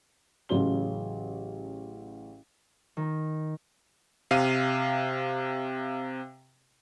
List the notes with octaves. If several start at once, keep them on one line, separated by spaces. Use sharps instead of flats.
A1 C#3 F#3 C#4 C6 G7
D#3
C3 F5 C7 D#7